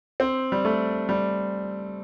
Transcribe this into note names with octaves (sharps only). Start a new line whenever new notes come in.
C4
G3
A3
G3